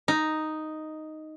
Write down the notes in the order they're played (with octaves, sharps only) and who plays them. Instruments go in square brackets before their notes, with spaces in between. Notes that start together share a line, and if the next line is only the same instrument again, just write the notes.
[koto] D#4